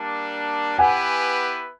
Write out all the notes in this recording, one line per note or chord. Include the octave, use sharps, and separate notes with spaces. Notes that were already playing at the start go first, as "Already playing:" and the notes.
Already playing: G3 A#3 D4
B3 E4 G4 B4 F#5 G#5